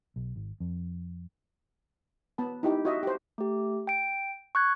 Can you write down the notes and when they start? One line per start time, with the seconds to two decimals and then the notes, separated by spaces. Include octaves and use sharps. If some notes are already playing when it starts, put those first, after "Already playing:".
0.16 B1
0.36 G#1
0.60 F2
2.38 B3 A5 B5
2.63 D#4 E4 G4
2.85 F#4 D#5 E5
3.03 G4 C5
3.38 A3 G4
3.87 G5 D7
4.55 C#6 F#6 G#6